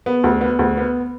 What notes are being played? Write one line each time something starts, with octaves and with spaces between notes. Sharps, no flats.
B3
D2
B3
D2
B3